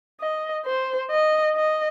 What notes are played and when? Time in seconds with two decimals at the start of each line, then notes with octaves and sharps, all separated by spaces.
0.21 D#5
0.65 C5
1.11 D#5
1.55 D#5